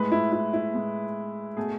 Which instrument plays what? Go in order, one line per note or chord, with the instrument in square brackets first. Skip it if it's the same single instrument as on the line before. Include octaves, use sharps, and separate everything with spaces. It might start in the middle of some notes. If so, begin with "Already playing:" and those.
Already playing: [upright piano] A2 G#3 B4
E4
E4
E4
A2 G#3
B2 A3 G#4